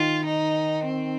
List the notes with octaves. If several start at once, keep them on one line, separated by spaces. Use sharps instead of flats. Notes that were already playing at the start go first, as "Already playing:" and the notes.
Already playing: D#3 F4
D#4
C4